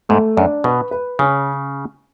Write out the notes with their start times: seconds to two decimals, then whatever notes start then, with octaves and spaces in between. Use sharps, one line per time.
0.09 G#2 A3
0.37 F#2 D4
0.64 B2 B4
0.91 B4
1.19 C#3 C#4